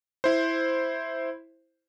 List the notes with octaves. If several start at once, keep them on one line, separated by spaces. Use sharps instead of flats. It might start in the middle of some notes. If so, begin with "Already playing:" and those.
E4 C5